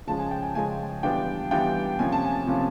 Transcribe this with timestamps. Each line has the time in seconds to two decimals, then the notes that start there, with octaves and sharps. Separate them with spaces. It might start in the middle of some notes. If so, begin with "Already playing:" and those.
0.07 C#3 F3 G#3 C#4 A5
0.19 G#5
0.31 G5
0.43 G#5
0.55 C#3 F3 G#3 C#4 G#5
1.03 E3 G3 B3 D4 F4 G5
1.51 E3 G3 B3 D4 F4 G5
1.99 C3 F3 A#3 C#4 G#5
2.12 A5
2.25 G#5
2.47 C3 F3 A#3 C#4